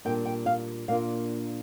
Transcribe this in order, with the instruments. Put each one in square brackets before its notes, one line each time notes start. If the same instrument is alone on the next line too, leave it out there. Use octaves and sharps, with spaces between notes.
[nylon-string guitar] A#2 G3 D4 G5
G5
F5
A#2 A#3 D4 F4 F5